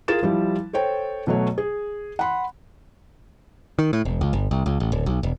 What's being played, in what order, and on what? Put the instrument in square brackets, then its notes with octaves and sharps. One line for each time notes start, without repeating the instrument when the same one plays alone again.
[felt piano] F4 G#4 A#4 A6 E7
F3 G3 E4
A4 C5 C#5 G5
B2 F#3 A3 C#5
G#4
F#5 B5 C6
[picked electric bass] D#3
A2
E1
C#2
G1
C2
C#2
A1
D1
B1
E1